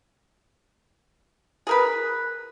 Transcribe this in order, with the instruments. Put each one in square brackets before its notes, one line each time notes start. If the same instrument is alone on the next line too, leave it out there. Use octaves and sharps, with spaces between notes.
[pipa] G#4 A#4 B4